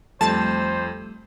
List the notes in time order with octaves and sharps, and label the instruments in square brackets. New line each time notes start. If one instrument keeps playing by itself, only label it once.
[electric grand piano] F2 [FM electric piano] G3 A3 [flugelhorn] C5 [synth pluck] A5